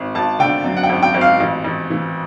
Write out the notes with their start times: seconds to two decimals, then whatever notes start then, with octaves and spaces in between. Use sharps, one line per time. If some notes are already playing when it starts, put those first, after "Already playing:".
Already playing: G#1
0.15 G#1 A5
0.39 D3 G5
0.64 F#2
0.77 F#5
0.83 G5
0.89 G#1
1.02 G5
1.14 G#1
1.21 F5
1.40 A1
1.64 A1
1.90 E3